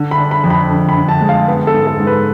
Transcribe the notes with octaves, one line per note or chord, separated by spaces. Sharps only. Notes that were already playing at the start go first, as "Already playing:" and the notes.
Already playing: D3
B5
D4
B5
F2
B5
D3
B5
D3
A5
G#3
F5
B3
A4
G#2
A4
G#2
B4